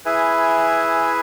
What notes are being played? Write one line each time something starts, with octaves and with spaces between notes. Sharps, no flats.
E4 G#4 B4 E5 G#5